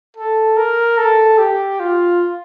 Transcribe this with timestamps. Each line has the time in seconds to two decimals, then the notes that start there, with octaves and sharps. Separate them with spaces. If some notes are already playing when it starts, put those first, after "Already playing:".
0.17 A4
0.57 A#4
0.98 A4
1.39 G4
1.80 F4